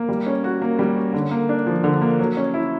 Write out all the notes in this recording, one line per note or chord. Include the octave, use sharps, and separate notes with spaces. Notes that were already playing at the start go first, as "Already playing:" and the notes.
Already playing: A#3
G3
C#4
F#4
A#3
G3
C#4
D3
A#3
D4
F3
D3
A#3
F#3
C#4
E4